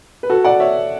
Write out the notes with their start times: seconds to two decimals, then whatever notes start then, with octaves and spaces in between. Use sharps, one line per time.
0.23 B4
0.30 F#4 A4
0.44 D5 F#5
0.60 C#5 E5